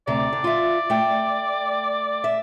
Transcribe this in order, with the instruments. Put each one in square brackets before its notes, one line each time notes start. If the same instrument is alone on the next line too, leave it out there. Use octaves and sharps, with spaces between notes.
[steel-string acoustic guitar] D2 C3 A#5 [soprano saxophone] D5
[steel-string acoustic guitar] D3
F4 E5
A3 G5
E5